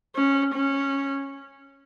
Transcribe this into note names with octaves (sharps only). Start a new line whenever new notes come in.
C#4
C#4